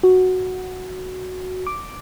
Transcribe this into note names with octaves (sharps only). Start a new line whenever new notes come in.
F#4
D6